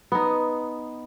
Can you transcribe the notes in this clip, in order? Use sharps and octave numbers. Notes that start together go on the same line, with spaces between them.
B3 D#4